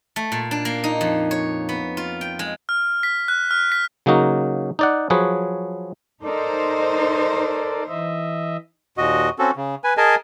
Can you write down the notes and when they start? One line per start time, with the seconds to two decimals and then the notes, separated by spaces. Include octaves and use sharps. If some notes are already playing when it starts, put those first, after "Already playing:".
0.16 A3
0.32 A#2
0.51 D4
0.65 A#3
0.84 D#4
1.01 F2
1.31 C#5
1.69 B3
1.97 F4
2.21 G5
2.39 G#3
2.69 F6
3.03 B6
3.28 F#6
3.51 F6
3.72 B6
4.06 C#3 F#3 A#3 D#4 F#4
4.79 D#4 D5 F#5
5.10 F3 F#3 G#4 B4 C#5
6.22 D#4 A4 A#4 C5 D5
7.89 E3 D#5 E5
8.98 D#2 A#2 F#4 D#5
9.39 C4 C#4 F#4 A4
9.57 C#3
9.84 B4 G#5
9.97 G#4 A#4 D#5 G#5 A5